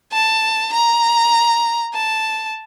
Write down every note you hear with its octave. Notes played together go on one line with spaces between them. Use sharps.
A5
A#5
A5